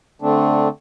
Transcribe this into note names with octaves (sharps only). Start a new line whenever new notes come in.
D3 A3 C4 D4